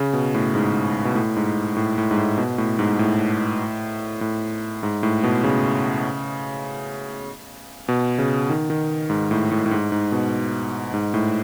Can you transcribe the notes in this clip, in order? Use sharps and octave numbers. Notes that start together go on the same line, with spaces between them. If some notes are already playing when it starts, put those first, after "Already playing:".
Already playing: C#3
B2
A2
G#2
B2
A2
G#2
A2
A2
G#2
A2
B2
A2
G#2
A2
A2
G#2
A2
B2
C#3
B2
C#3
D#3
D#3
G#2
A2
A2
A2
G#2
G#2
B2
G#2
A2